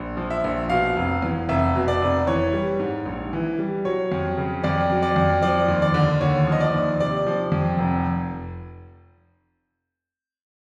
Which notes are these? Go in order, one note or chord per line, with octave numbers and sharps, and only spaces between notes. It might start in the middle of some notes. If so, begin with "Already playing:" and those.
Already playing: A#1
F3
E5
A#1
B2 F5
F1
E2
F1 E5
B2
D5
F1
E3 C#5
G3
G#2
A#1
E3
G3
F#3 C#5
F2
C#3
F2 D5
F#3
D5
F2
F3 D5
D#2
D5
D3
D#2 C#5
F3
D#5
D5
D#2
C3 D5
F3
F2
F1